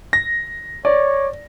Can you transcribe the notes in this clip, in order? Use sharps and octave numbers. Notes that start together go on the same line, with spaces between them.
A#6
C#5 D5